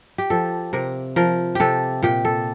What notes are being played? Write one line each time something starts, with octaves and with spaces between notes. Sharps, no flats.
G4
F3 A4
C3 A#4
F3 A#4
C3 G4 A4
A#2 G4
A4